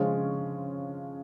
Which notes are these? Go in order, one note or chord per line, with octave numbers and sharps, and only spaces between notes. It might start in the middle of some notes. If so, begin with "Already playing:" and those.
Already playing: C#3 F3 G#3 C#4 F4